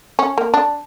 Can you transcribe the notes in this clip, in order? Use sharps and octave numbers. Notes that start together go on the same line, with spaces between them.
C#4
A#3
D4